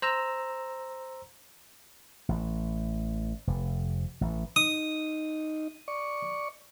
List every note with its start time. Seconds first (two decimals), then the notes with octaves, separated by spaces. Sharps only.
0.02 C5 A#5 E6
2.29 A1
3.47 F1
4.21 A1
4.56 D#4 D#6
5.88 D5 C#6